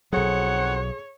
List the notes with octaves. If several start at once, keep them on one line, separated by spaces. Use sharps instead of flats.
B1 F2 F#3 G#4 A4 C5 C#5 F#5